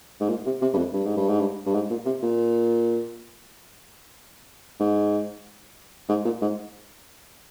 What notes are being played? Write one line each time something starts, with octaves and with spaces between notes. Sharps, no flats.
G#2
A#2
C3
C3
G2
F2
G2
G#2
G2
G#2
G2
G2
G#2
A#2
C3
A#2
G#2
G#2
A#2
G#2